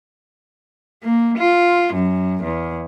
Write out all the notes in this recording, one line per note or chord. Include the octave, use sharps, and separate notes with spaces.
A#3
F4
F#2
E2